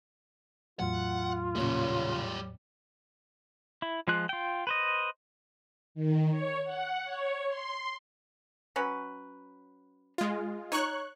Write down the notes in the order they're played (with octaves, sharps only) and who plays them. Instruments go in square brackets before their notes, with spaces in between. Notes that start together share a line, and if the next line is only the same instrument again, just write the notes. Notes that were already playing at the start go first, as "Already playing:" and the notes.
[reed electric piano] E2 A2 F#3 [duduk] F4 [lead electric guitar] F#5
[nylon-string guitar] A#2 C#3 [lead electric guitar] G3 C#5
[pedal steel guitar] E4
F3 G#3 F4 F#6
F4 G5
B4 C5 D#5
[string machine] D#3
C#5
F#5
C#5
C6
[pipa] F#3 C#4 B4
[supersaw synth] G#3 F4
[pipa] D#4 [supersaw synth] C#5 C#6 F#6